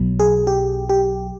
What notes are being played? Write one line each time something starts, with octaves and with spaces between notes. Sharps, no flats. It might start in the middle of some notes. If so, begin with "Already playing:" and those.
Already playing: B1 B2 F#3
G#4
G4
G4